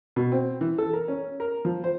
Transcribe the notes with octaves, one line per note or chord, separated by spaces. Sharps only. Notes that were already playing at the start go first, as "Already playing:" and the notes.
B2
C4
E3
A4
A#4
C#4
A#4
F3
C5